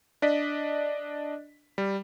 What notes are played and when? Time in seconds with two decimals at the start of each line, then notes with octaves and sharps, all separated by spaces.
0.22 D4 D5 D#5 B6
1.78 G3